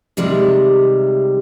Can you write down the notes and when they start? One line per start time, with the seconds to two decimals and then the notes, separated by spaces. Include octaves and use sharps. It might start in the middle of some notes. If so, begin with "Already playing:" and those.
0.17 C3 D#3 G3 G#3